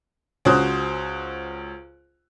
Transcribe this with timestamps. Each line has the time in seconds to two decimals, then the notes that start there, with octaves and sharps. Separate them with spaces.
0.45 C#2 C#4 F#4 C5 D#6 F#6